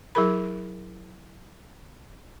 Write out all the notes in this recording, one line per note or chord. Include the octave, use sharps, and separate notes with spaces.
F#3 E4 G#4 A#4 B5